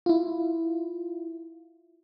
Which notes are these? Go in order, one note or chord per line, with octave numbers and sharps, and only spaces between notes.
E4 F4